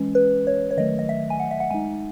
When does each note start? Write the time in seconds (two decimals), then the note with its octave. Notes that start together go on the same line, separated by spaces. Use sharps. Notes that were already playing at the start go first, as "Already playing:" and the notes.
Already playing: E3 G#3 C#4
0.15 B4
0.47 C#5
0.71 C#5
0.77 D#3 F#3 A3 D#5
0.99 D#5
1.09 E5
1.30 G#5
1.40 F#5
1.51 E5
1.60 F#5
1.71 G#3 D#4 G#5